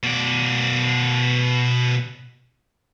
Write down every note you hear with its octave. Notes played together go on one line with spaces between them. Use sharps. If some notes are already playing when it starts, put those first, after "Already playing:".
B2 D5